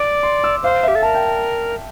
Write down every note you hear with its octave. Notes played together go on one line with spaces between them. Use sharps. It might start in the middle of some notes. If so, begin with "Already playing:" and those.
Already playing: D5 D6
C6
E6
C5 F5
G4 E5
A4
A#4 A5
G5
A5